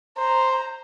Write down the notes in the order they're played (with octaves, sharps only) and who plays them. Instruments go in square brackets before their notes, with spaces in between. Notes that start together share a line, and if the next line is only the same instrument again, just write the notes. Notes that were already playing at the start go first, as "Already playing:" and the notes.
[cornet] C5 [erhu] A#5